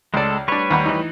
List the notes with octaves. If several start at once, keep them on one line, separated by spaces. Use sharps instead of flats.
C#2 G#3 A4 D5
G3 D4 B4 C#5 C#6
D#2 F#5 B5
E3 D#4